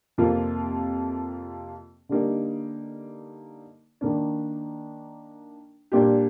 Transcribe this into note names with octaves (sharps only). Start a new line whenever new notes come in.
F2 C3 F3 A#3 F4
D3 G3 A#3 D#4
D#3 A#3 D4
A#2 G3 A#3 D4 G4